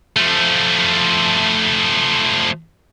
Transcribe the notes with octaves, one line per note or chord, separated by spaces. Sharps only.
F3 A3